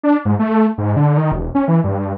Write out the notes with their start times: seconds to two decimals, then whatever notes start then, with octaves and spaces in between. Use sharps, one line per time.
0.03 D4
0.25 G#2
0.39 A3
0.78 G#2
0.96 D3
1.17 D#3
1.32 E1
1.55 C#4
1.68 E3
1.84 G2